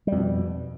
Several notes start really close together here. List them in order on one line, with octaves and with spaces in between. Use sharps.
G3 F2 B2